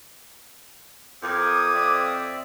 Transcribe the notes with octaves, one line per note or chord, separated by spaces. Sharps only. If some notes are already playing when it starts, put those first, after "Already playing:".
F2 A#4 D6 D#6
C4 D5 E5